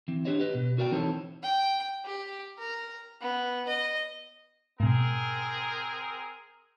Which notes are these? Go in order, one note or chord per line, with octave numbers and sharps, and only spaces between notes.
E3 C4
D4 G4 C5 C#5 D#5
G4 B4 D#5
B2
F#4 A#4 D5 F5 G5
E3 C4 D#4 A4 C5 C#5
G5
G4
A#4
B3
D#5
G#2 B2 C4 G#4 A#4